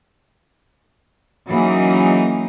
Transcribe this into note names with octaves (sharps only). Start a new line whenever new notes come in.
E3 F#3 A#3 C#4 D#4 G#4